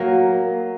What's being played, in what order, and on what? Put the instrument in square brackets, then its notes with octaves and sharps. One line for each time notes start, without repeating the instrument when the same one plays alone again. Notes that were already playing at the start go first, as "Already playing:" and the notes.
Already playing: [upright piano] F#3 [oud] A#3